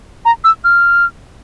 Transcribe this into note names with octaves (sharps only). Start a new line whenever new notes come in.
A#5
E6
F6